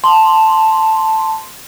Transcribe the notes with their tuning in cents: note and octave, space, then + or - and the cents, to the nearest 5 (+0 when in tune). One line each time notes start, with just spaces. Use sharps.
A5 +0 C6 +0